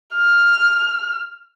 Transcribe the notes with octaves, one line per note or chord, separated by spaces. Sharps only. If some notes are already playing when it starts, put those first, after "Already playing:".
F6